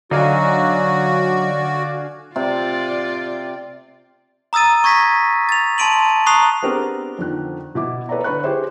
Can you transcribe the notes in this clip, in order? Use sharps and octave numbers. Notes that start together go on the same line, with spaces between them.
D3 F#3 D#4 F#4 D5 F5 G#5
C3 F4 D5
A#5 D#6 E6 A6 D#7
C#6 G#6 A#6 B6
A6 F7
A5 C6 D7 D#7 F#7
A#5 C#6 D#6 F#6 C7 F7
B3 C4 D4 G4 G#4 A#4
F2 D3 D#3 F#6
B2 E4 D6
A4 B4 C#5 D5 E5 A#5
D3 B4 B5 C#6 F#6
E4 G4 G#4 B4 C5 E5